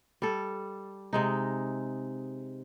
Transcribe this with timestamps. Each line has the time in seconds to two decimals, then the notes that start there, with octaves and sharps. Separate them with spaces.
0.22 G3 A4
1.13 C3 G#3 D#4